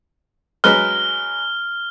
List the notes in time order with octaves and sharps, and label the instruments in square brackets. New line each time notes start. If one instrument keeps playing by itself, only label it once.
[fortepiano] F#3 G#3 B4 [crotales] F6